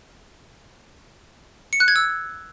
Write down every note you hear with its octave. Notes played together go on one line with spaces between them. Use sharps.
C#7
F#6
G#6
E6